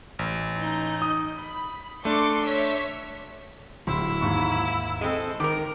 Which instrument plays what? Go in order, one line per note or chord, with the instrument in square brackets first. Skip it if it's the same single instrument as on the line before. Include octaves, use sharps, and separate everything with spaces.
[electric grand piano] A1
[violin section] D#4 G6
[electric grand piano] D#6
[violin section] B5
[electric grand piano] A3 D4 [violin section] C6 D6 C#7
[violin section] C#5 E5 B6
[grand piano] D1 C6 [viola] E4
[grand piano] D#2 G#2 C#6
[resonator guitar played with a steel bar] G#3 C4 A4
[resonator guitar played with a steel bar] D#3 A#4 [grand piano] D6